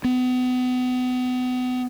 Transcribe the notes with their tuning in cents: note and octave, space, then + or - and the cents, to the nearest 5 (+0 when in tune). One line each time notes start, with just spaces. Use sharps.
B3 +35